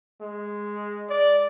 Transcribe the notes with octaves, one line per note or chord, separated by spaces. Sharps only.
G#3
D5